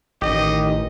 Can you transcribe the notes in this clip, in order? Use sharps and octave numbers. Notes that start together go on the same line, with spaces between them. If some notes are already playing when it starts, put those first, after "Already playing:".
A1 D#3 G4 D#5